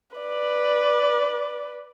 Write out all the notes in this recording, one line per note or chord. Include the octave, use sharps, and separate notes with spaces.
B4 D5